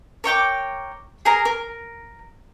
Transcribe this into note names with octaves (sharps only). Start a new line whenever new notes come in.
A#4 C#5 G5 D6
G#4 A#4 A#5
A#4